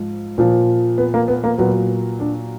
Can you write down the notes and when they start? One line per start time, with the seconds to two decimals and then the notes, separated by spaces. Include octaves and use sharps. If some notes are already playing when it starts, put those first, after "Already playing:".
Already playing: G#2 F3
0.38 A#2 F3
0.98 B3
1.14 A#3
1.28 B3
1.44 A#3
1.58 A#2 F#3 B3
2.19 D4